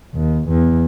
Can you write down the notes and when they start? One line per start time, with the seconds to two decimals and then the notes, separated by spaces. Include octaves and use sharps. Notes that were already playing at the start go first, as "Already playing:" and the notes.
0.15 D#2
0.49 E2